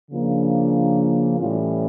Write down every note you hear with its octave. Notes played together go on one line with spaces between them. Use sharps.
C#3 F3 A#3 D4
A2 E3 G3 C#4 F4